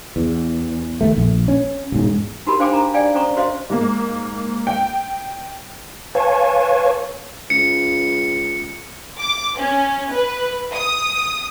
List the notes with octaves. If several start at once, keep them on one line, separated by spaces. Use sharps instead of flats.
E2
D#2 A3
A#1
C#4
E1 G#2
D#4 F#4 G4 A#4 A5 B5
D4 C5 F5 G5 G#5 D6
A4 A#5
D5 F5 G5 G#5
C#4 A4 C5 A#5 C#6
F#4 B4 C5 D#5 F5
G#2 A#3
G5
B4 C#5 F5 G#5 A5 C#6
C#2 C#7
D6
C#4
B4
D#6